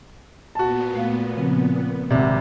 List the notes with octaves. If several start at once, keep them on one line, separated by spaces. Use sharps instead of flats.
A#2 B3 F#4 A5
A3 F5
C#3 F3 C4
G#1 C3 D5 E5 F#5